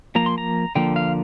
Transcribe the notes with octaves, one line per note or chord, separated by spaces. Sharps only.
F3 A#3 A#5
C6
A#5
D3 F3 A#3 G5
F5